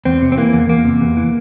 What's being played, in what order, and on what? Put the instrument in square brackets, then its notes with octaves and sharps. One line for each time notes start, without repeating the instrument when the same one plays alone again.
[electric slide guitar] E2 C4
C3
C4
E3 A#3
E2
E2 A#3
C3
E2
E3